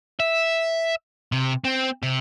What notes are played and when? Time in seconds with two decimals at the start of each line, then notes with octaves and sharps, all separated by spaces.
0.20 E5
1.32 C3
1.64 C4
2.03 C3